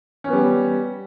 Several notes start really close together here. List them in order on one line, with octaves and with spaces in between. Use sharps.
C#4 B3 G3